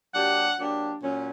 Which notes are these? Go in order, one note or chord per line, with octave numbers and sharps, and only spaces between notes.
F#3 A#3 D4 G4 F#5
F#3 A#3 D4 G4
A#2 F#3 C#4